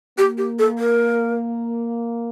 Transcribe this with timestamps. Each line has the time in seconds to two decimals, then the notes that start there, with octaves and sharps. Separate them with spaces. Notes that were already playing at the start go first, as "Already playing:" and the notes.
0.18 A#3 G4
0.38 G4
0.59 A4
0.79 A#4